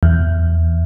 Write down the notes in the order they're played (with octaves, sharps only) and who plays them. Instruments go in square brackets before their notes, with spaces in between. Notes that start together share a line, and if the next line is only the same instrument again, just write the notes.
[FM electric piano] E2